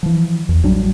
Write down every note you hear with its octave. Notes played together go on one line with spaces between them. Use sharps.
E3 F3
E2
A1 F#3 G3 D4